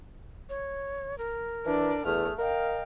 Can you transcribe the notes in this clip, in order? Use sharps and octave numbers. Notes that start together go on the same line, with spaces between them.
C#5
A#4
E3 D4 D5
E2 A3 G#4 F6
A#4 D#5 F5 G5